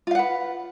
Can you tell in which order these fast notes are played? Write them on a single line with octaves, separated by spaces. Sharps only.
F4 F5 F#5 B4